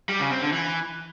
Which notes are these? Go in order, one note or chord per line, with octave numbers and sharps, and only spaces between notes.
G3
C#3
C4
D3
E3